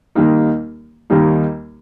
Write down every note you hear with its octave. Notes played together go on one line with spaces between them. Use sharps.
D#2 D#3 G3 A#3 D#4
D#2 D#3 G3 A#3 D#4